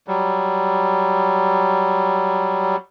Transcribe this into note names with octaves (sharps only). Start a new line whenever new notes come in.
F#3 G3